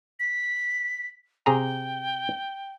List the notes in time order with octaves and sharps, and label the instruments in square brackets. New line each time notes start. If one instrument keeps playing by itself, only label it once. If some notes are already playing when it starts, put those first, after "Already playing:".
[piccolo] B6
[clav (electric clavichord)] C3 G#4 A#5 [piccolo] G5